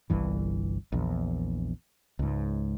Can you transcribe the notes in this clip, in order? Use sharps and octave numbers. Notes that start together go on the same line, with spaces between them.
G1 C2 G2 E3
A#1 E2
C#2 G#2